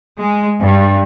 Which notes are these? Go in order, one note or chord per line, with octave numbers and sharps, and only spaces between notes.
G#3
G2